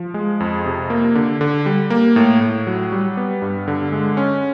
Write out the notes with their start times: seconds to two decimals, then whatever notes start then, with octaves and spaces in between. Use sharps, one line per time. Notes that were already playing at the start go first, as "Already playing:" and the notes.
Already playing: F3
0.14 G#3
0.40 F2
0.66 C3
0.90 A#3
1.15 D3
1.41 D3
1.66 G3
1.90 A#3
2.16 A2
2.41 A2
2.67 F#3
2.92 G3
3.17 B3
3.42 G2
3.68 D3
3.92 G#3
4.17 C#4